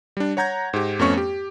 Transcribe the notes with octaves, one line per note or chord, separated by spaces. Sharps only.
G3 D4
C#5 F#5 A#5 G6 G#6 A#6
G#2 G4
F2 A3 B3 C#4 C#6
G4